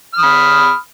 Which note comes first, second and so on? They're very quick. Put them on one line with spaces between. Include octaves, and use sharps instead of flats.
F6 D#6 B5